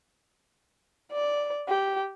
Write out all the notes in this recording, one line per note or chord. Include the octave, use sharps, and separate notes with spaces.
D5
G4